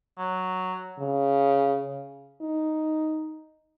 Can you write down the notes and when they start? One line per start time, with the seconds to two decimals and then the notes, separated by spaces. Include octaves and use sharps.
0.18 F#3
1.00 C#3
2.41 D#4